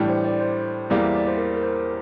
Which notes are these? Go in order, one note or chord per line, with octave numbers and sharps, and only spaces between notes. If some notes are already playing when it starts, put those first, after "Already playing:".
Already playing: A2 E3 G3 D4
C5
D5
C5
E2 E3 G3 A#3
E5
D5
C5
A#4
A#4
C5